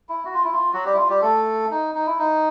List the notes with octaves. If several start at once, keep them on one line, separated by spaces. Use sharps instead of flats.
E4
F#4
F4
E4
F4
F#3 F#4
G3 G4
E4
F4
G3 G4
A3 A4
D#4
D#4
E4
D#4